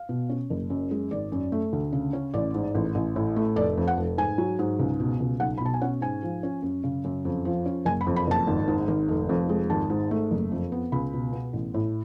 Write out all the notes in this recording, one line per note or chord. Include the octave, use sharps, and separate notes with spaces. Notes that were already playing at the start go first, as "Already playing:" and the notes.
Already playing: F5
B2
C#4
F#1
F#2
G#3
G#1 D5
F#2
A3
D2
C#3
C#4
A1 D5
G#2
A1
A1
A2
A3
F1 D5
F2
F#5
F1
G#2 G#5
F#3
G#2
C#2
B2
C#2
B1 F#5
B5
B2 A5
G#5
C#4 F#5
G#2 G#5
F3
C#4
F#2
C#3
F#2
F2
F3
C#4
F#1 G#5
B5
F2
B5
F#1 A5
G#1
G#2
G#1
F1
F2
G#3
G#1 A5
G#2
A3
F#1
F2
B3
C#2 B5
B2
B3
A1
A2